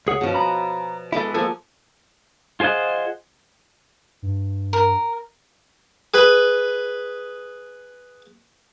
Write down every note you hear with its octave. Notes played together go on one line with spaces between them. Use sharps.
C#2 G#4 C#5 F#5
G2 B2 F3 C#4
A#5 B5
G#3 B3 E4 A4 D6
F3 A#3 A4 G#5
F4 G#4 C5 D#5 F#5
G2
A#4
G#4 B4 B5